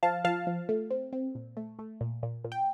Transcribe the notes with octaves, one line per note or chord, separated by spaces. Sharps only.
F3 F5 A5
F3 F5 A5
F3
A3
C4
C4
A#2
A3
A3
A#2
A#2
A#2
G5